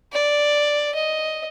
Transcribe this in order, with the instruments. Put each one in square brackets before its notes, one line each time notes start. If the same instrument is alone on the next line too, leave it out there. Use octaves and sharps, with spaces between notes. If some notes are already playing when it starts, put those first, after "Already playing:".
[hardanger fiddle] D5
D#5